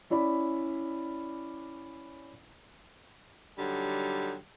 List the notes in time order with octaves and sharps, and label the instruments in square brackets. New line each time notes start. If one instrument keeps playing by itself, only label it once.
[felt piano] C#4 E4 D5 B5
[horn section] D3 F#3 G3 D#4